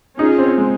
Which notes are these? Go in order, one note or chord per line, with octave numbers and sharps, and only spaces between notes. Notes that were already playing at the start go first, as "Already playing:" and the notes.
C#4 D#4 F4 G#4
C4
G#3